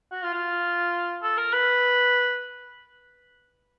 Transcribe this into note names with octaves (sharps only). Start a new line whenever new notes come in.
F#4
F4
F4
A4
A#4
B4